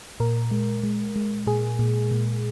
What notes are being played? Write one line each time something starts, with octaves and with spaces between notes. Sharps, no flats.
A#2 A#4
G#3
G#3
G#3
A#2 G#4
A#2
A#2